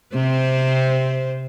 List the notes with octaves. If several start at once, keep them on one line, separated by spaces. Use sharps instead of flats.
C3 C4 C5